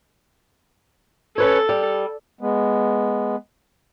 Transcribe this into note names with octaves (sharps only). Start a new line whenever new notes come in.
C#4 A4 B4 C#5
G3
G#3 B3